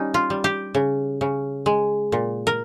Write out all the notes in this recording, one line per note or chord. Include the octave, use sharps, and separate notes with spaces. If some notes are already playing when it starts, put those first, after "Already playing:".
Already playing: G3 C#4 D#4
F4
G3
G4
C#3
C#3
G#3
A#2
A#4